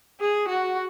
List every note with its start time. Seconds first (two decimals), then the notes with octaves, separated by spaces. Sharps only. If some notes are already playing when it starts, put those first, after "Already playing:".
0.21 G#4
0.49 F#4